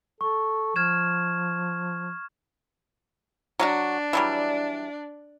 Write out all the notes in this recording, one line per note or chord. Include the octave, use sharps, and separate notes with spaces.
A4 C#6
F3 F6 G#6 E7
F#3 D4 F4 F#4
E3 F#3 G3